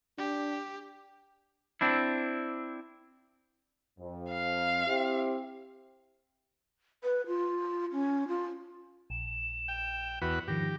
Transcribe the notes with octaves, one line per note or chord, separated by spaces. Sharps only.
D4 G4
C4 D4 E4
F2
F5
C4 E4 G4
B4
F4
C#4
F4
A#1 E7
G5
E2 F#4 B4
G#2 D#3 F3 G4 A#6